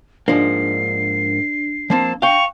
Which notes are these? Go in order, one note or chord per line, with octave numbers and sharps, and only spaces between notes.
G#2 F3 A#3 D4 C7
F3 A#3 C4 A5
F5 G5 C#6 F7